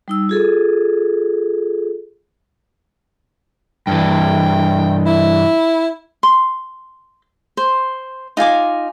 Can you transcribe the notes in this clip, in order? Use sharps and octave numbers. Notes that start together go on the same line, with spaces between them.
G3 D#4 E6
F4 G#4 A4
G2 E3 G5
E4
C6
C5
D#4 F4 G#5 D6